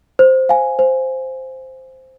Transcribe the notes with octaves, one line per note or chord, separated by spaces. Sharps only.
C5
F5 G#5
C5